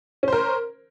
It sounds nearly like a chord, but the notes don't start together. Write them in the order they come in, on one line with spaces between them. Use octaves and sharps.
C#4 C5 A#4